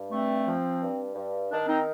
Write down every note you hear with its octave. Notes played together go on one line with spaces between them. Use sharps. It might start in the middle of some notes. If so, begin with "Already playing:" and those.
Already playing: G2
A3 C4
F3
G2
G2
D#3 D4
C4 D#4